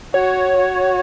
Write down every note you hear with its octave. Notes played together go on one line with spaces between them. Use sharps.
F#4 C#5
F#4